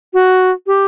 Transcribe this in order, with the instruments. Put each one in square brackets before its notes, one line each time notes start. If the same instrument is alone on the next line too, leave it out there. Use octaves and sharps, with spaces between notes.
[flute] F#4
G4